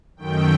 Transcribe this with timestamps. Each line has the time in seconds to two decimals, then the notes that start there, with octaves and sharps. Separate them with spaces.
0.16 F#2 D#3 A3 G5